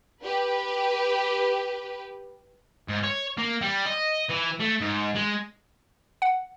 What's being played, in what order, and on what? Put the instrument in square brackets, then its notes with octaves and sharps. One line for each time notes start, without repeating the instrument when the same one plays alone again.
[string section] G4 B4
[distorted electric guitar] G#2
C#5
A#3
G3
D#5
E3
A3
G#2
G#3
[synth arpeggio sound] F#5